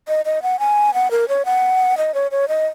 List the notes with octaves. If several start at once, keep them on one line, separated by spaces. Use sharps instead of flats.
D#5
D#5
F#5
G#5
F#5
A#4
C#5
F#5
D#5
C#5
C#5
D#5